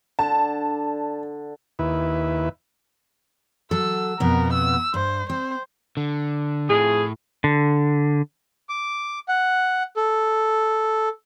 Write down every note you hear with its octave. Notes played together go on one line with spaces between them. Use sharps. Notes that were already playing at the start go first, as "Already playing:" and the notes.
D3 A5
D#2 E4 B4
F#3 A4 E6
F2 B2 B3 A#4
E6
G2 C5
C4 C5
D3
F2 A2 G#4
D3
D6
F#5
A4